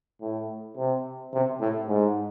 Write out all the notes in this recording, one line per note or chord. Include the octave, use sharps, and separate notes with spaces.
A2
C3
C3
A2
G#2